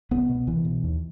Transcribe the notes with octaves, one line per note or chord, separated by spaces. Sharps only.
C2 B3
B2
C2 E3
B2
D#2